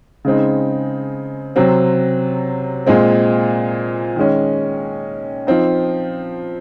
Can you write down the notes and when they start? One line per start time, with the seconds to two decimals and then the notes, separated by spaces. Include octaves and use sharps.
0.25 C#3 G#3 C4 D#4
1.56 C3 F#3 C4
2.87 A#2 G#3 C4
4.16 D#3 G#3 C#4
5.47 F3 C4 D#4